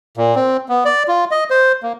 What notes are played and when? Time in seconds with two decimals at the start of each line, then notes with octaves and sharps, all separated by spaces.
0.17 A#2
0.36 C4
0.69 B3
0.85 D5
1.08 F4
1.31 D#5
1.50 C5
1.83 A#3